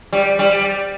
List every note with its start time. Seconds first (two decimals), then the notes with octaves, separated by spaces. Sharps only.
0.13 G3
0.39 G3